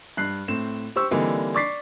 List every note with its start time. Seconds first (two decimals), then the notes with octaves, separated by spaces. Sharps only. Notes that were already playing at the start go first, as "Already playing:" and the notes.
0.17 G2 F#6 C7
0.48 A2 C4 E7
0.96 G4 C5 C#6 E6
1.11 D3 E3 G3 A#3 C4 D#4
1.54 D5 C#6 D6 A6 B6 C7